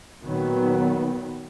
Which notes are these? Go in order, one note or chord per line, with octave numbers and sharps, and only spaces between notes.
A#2 D#3 F#3 B3